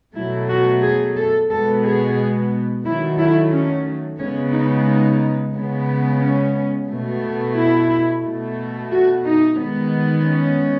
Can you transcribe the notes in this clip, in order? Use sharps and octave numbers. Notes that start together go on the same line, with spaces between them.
B2 F#3 A3 E4
F#4
G#4
A4
B2 G#3 B3 A4
G#4
D#3 F#3 A3 E4
E4
C#4
C#3 G#3 B3 C#4
D#4
D#4
C#3 G#3 B3
C#4
B2 A3
E4
B2 A3
F#4
D#4
D#3 G#3 B3
C#4